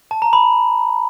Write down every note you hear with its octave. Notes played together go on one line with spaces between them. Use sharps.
A5
A#5
B5